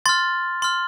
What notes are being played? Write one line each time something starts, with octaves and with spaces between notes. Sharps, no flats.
C6 F6 A6
C6 F6